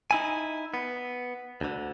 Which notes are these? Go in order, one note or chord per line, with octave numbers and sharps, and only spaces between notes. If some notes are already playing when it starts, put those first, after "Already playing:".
D#4 E4 G#5
B3
D2 D3